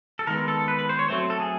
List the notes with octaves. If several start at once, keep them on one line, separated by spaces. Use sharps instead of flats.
A4
D#3 G#3 B3 A#4
A4
B4
B4
C5
C#5
F#3 A3 C4 C5
A4
G#4